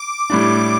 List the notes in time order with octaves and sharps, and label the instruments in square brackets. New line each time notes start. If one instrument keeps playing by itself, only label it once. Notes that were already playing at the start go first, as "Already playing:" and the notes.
Already playing: [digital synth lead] D6
[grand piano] A2 G3 D4